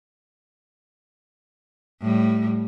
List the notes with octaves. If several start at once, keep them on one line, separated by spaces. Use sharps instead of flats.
A2 G3